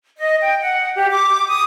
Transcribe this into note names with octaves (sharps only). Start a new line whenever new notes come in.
D#5
G5
F#5
G4
D6
D#6